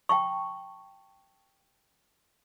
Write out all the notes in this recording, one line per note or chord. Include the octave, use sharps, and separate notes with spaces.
G5 A5 C#6